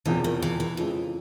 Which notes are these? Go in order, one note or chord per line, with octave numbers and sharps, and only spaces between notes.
E1 E2 C3 E3 F3
D#3
E3
E3
F2 C#3 E3 F3 G#3